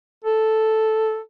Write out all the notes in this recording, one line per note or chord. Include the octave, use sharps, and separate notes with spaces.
A4